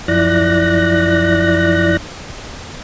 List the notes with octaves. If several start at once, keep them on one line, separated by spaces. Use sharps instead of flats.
F#2 F3 E4 D5 F#6 A#6